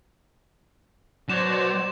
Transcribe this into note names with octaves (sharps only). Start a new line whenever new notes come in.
B2 F#3 C5 D5 E7